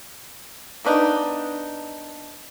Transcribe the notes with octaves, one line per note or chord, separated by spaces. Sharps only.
A#3 B3 D4 D#4